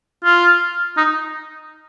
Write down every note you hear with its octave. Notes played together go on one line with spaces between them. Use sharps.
F4
D#4